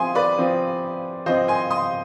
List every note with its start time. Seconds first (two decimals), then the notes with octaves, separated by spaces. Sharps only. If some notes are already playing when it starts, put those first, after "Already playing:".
Already playing: F3 C4 G#5 C6 D#6
0.15 B4 D5
0.38 F3 C4
1.26 F3 C5 D#5
1.29 C4
1.48 G#5 C6
1.70 C6 D#6